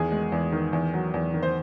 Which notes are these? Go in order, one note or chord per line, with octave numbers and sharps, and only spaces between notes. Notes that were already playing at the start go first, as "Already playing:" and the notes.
Already playing: E2 D#3 G#4
G#3
E2
D#3
E2
F#3
E2
D#3
C5